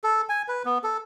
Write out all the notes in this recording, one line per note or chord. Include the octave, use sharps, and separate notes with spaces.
A4
G#5
B4
B3
A4